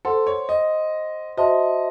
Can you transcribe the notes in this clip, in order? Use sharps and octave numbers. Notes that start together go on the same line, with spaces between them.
A4 C5 F#5 C6
C#5
D#5
F#4 C5 D#5 E5 A5 C6